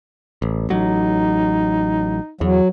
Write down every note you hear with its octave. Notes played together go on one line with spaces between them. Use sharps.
A1
A1 F#3 D#4
E2 F#3